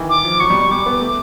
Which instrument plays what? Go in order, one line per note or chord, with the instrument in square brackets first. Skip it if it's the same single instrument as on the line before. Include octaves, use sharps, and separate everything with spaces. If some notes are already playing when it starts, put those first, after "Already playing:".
Already playing: [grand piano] D#3 E3
[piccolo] D6
[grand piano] F3
[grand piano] F#3 [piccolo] C#6
[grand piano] G3
G3
[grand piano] G3 [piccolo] D6
[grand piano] B3
A3